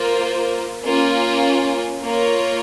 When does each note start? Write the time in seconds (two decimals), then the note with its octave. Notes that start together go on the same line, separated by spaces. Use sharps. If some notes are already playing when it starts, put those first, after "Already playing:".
Already playing: A#3 F4 C5
0.84 A#3 C#4 F4
2.03 A#3 F4 A#4 C#5